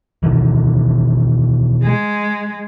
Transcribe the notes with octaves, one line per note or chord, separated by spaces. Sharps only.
B2 D#3 E3
G#3